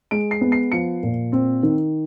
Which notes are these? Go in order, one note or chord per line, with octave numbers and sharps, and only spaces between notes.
G#3 D7
C7
B3
C7
F3 C#7
A#2
C4
D#3